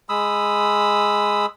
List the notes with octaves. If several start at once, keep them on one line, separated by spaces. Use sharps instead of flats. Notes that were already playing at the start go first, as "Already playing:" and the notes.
G#3 B5 D#6 E6